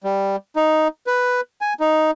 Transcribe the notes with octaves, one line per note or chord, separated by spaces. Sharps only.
G3
D#4
B4
G#5
D#4